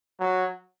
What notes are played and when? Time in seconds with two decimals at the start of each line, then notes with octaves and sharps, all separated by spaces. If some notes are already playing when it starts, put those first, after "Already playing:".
0.20 F#3